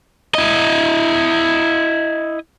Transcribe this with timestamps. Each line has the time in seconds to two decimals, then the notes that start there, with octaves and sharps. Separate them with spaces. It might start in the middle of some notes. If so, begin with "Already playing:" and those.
0.35 E4 D#5